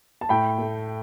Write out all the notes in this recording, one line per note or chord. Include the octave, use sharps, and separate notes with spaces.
A5
A2 G5 B5
A3